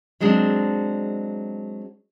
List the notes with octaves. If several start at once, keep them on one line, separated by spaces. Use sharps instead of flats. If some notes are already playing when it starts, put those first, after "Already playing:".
F#3 G#3 C4 D4